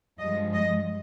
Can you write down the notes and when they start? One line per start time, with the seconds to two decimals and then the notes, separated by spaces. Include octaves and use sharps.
0.19 G2 F3 G#3 D#5
0.54 D#5